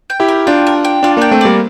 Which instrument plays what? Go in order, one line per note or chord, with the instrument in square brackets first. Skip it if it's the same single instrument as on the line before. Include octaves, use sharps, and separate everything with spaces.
[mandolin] G5
[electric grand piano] E4 G4
[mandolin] A#4
[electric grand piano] D4 F4 [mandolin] G5
[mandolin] A#4
G5
[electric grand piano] D4 F4 [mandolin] D5
[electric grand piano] A#3 D4 [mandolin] G5
[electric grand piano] A3 C4
[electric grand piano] G3 A#3 [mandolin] D5